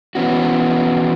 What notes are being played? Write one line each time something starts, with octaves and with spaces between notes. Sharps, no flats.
E3 B3 C#4 F#4